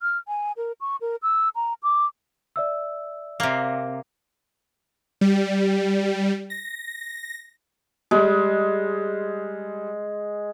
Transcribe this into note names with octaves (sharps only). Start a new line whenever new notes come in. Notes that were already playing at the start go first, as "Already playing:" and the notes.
F6
G#5
A#4
C#6
A#4
E6
A#5
D6
D5 E5 E6
C3 A#3
G3
A#6
G3 G#3